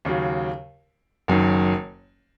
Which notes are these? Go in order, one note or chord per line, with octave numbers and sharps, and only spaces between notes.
D#2 C#3 F#3
F#1 F#2 D#3